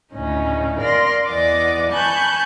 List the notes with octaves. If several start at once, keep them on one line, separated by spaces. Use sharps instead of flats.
D2 A2 C#3 C#4 D#4
A#4 D5 F5 C6 A#6
E2 E3 D5 D#5 F#5 D6
G#5 A5 B5 C#6 F#6 G6